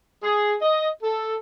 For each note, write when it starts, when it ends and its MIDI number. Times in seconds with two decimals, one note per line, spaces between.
0.23 0.55 68
0.62 0.88 75
1.03 1.36 69